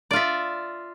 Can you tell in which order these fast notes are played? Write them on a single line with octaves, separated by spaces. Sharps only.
D5 F4 E5